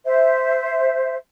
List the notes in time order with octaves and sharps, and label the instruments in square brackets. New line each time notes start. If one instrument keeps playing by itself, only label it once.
[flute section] C5 E5